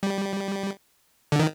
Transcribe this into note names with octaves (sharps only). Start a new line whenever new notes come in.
G3
D3
D#3